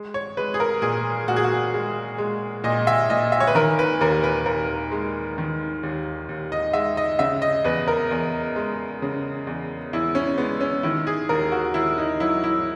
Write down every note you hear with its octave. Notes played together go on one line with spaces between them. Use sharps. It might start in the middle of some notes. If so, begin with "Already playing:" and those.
Already playing: G#3
C#5
G#3 B4
G#4
A#4
A#2 G#4
A#2 F#4
G#4
F#4
G#3
G#3
A#2 D#5
E5
A#2 D#5
E5
C#5
B4
D#3 A#4
B4
D#2 A#4
B4
D#2 A#4
G#3
D#3
D#2
D#2
D#5
G#3 E5
D#5
C#3 E5
D#5
E2 B4
A#4
E2
G#3
C#3
E2
E2 E4
C#4
G#3 B3
C#4
D#3 E4
G#4
D#2 A#4
F#4
D#2 E4
D#4
F#3 E4
E4